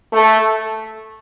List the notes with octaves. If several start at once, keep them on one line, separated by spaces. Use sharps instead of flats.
A3